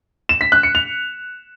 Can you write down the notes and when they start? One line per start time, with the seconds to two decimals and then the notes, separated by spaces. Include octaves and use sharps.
0.29 E7
0.41 B6
0.52 F#6
0.63 C#7
0.75 F7